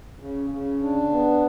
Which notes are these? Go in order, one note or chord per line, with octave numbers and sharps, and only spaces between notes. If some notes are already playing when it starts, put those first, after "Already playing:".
C#3
C#3
D4
B3